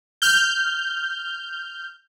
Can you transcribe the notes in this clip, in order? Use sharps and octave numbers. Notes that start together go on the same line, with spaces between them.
F6 G6